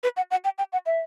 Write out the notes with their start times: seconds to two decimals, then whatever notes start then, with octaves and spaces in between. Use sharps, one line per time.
0.03 B4
0.17 F#5
0.31 F#5
0.44 G5
0.58 G5
0.72 F#5
0.86 E5